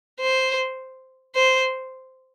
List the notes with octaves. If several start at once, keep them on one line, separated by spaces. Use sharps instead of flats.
C5
C5